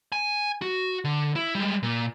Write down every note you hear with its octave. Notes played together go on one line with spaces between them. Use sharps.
G#5
F#4
D3
E4
G3 G#3
A#2